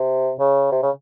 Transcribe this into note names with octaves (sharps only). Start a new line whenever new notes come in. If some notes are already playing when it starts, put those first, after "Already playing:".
Already playing: C3
C#3
C3
C#3